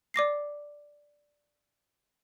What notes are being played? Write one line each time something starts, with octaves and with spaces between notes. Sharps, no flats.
D5 D6 A#6 C7